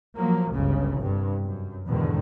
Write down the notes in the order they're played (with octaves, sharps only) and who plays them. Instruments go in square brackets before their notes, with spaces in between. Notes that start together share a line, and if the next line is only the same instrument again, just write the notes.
[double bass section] F3 F#3 A#3
G1 C#2 C#3
C2 G2
F#2
E2 G#2 B2 D3 D#3